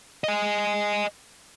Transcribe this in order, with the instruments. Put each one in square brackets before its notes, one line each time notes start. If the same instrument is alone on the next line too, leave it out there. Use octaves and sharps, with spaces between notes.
[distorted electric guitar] D#5 G#5